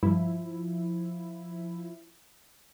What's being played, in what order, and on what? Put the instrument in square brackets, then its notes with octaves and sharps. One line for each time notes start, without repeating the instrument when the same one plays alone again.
[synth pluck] G2 [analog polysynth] F3 E4